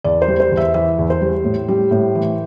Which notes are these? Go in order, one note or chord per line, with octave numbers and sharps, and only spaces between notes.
E2 D5
C5
G3
C5
E2
E5
E3 E5
E2
C5
G3
A2
G3
A2
E3